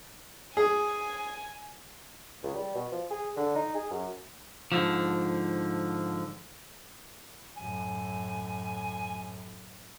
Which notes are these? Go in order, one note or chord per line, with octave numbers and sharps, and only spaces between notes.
G#4 G#5
C#2
G3
B2
F3
G#4
D3
D#4
G#4
F#2
G#2 B2 D3 F3
F#2 A2 G#5